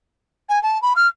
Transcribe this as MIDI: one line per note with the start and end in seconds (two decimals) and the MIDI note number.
0.49 0.61 80
0.63 0.80 81
0.82 0.93 83
0.96 1.07 89